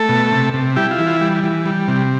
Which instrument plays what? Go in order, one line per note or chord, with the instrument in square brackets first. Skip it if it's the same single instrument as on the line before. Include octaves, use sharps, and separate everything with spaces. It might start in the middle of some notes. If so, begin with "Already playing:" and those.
Already playing: [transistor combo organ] A3 A4
B2
C3
C3
G3 E4 G4
F4
E3
F4
G3
E3
G3
C3